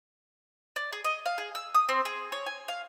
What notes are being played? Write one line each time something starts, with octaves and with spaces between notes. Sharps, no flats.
D5
G#4
D#5
F5
G#4
E6
D#6
C4
G#4
C#5
G#5
F5